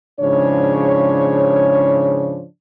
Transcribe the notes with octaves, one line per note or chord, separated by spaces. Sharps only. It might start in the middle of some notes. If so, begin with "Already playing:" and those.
G#2 C#3 F3 D4 C#5